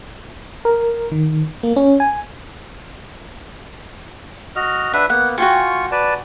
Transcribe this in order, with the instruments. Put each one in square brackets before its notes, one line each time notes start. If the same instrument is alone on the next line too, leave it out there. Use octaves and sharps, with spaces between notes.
[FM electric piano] A#4
D#3
A#3
C#4
G#5
[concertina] F#4 D#5 F6
[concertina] D4 B4 E5 [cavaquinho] F#5
[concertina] A#3 B3 [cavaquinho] F#5
[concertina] F4 C#6 [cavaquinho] F#4 G5 G#5
[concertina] B4 D5 A5